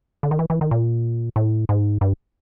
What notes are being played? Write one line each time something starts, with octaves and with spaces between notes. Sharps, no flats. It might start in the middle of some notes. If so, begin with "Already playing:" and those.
D3
D#3
E3
E3
D#3
A#2
A2
G#2
G2